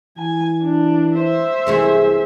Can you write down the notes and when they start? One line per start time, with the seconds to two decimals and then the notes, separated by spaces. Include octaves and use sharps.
0.17 E3 G#5
0.62 D4
1.17 C5 E5
1.66 C2 E3 G#3 A3